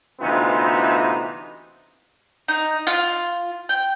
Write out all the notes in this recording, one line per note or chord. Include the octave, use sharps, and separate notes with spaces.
D2 C3 E3 B3 D#4 F4
D#4
F4
G5